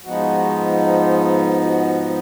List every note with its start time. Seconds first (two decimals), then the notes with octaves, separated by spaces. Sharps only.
0.04 G#2 F3 B3 D#4 F#4
1.62 F#4